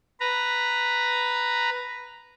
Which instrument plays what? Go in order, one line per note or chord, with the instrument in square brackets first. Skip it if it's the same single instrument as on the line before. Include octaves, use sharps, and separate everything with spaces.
[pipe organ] B4 A#5